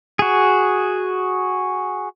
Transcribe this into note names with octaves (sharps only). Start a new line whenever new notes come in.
F#4 G#4